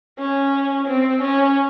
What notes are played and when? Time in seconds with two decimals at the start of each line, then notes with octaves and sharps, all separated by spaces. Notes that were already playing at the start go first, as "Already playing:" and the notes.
0.19 C#4
0.88 C4
1.22 C#4